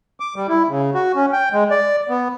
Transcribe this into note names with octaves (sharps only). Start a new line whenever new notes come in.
D6
G3
E4
C#3
F#4
C#4
G5
G#3
D5
B3